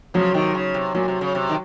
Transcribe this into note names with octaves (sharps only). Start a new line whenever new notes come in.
C#3 F3 F#3
C3 D#3
C#3
C3
A#2 F#3
C3
C#3
C3
D#3